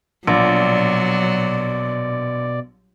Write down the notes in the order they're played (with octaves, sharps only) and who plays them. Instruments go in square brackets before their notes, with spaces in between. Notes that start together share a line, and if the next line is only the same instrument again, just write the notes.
[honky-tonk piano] A#1 [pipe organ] B2 D5 [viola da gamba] F#3 [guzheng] G3